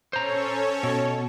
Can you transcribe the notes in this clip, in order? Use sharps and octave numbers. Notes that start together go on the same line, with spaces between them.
C#4 A4 C5 C#5 A#5
B2